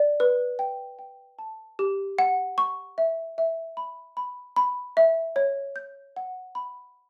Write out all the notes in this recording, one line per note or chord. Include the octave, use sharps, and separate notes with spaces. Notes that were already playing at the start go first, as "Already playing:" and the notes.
Already playing: D5
B4
G5
G5
A5
G4
F#5
C#6
E5
E5
B5
B5
B5
E5
C#5
G6
F#5
B5